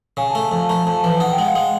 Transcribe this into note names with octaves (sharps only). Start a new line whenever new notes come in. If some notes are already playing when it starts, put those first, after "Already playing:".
C#3 G#5
A3 A5
F2 A5
A3 A#5
F2 A5
E3
D#4 F#5
G5
G#3 F#5
F5
G#3